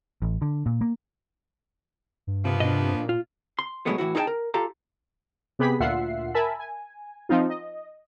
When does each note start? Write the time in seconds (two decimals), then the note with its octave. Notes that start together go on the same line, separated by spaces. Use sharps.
0.22 A1
0.42 D3
0.66 A#2
0.81 A#3
2.27 G2
2.44 C3 F3 A#3 B3
2.60 B2 D4 D#5
2.72 C3
2.94 A#2
3.09 F4
3.59 C6
3.86 B2 D3 F#3 G#3 A3 B3
3.98 A2 E3 E4 F#4
4.15 D#4 G#4 A4 D#5 G5 A5
4.27 A#4
4.54 F4 G4 A4 F5 A#5
5.59 C3 B3 G4 G#4 B5 B6
5.80 D2 A#2 F4 E5 F#5 C7
6.34 A#4 E5 G#5 A5 B5
6.60 G#5
7.29 F3 C4 D#4 F4
7.50 D#5